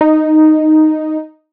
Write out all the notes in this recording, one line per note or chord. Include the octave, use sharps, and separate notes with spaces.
D#4